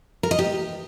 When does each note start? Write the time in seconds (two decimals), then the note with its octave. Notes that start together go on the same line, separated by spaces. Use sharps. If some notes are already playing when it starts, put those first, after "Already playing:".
0.23 A#4
0.31 D#5
0.39 G4